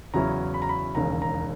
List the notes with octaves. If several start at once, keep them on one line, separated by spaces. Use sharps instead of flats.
E2 C#3 F#3 C#4 E4 A#5
B5
A#5
B5
E1 D#2 C#3 A#5
A#5